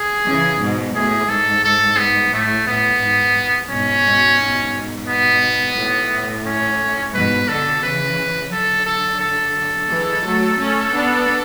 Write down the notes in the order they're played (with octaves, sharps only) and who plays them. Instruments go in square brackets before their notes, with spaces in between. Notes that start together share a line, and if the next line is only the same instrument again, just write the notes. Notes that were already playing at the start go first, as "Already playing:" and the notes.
Already playing: [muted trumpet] G#4
[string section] C#3 E3
G#2 B2
[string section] A2 [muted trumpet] G#4
[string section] G#2 [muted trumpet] A4
[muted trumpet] A4
B3
[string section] A2 [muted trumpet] A3
[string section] A2 [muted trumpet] B3
[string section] G#2
[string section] G#2 B2 [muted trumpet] C#4
[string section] G#2 B2
G#2 B2
[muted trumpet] B3
[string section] A2
[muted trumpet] C#4
[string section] G#2 B2 [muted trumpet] B4
[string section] B2 D3 [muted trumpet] A4
[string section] C#3 E3 [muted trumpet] B4
[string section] D3 F#3 [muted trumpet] A4
[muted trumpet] A4
A4
[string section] E3 G#3
F#3 A3
A3 C#4
B3 D4